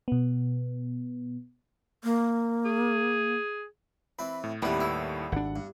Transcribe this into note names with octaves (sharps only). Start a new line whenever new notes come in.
B2 B3
A#3
G#4
E3 C4 B4 B5
A2
D#2 A2 C3 G3 B3 G4
E4 A4
G#1 D4 F#5
G2